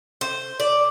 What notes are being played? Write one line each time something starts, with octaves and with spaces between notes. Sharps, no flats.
C5
D5